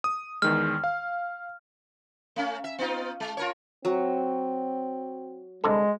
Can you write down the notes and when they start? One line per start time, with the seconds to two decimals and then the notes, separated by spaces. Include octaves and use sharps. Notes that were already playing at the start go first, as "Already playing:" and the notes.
0.04 D#6
0.42 E2 D#3 G#3 F6
0.84 F5
2.36 A3 C#4
2.64 E5
2.79 B3 D#4 F4
3.20 G#3
3.37 F4 A#4 C#5
3.85 F#3 C4
5.64 C2 D3 G#3 A4